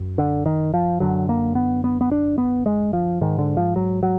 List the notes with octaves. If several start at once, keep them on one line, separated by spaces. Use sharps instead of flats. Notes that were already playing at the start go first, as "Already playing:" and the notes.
Already playing: F#2
D3
D#3
F3
F#2 D3 F#3
A#3
B3
B3
B3
D4
B3
G#3
F3
G#2 D#3
D3
F3
F#3
F#3